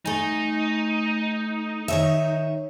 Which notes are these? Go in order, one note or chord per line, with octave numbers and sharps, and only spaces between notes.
A3 D#4 G#5
D#3 C#5 E5